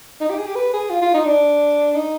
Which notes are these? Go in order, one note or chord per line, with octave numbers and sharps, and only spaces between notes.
D#4
G4
G#4
G4
B4
G#4
F4
F4
D#4
D4
D#4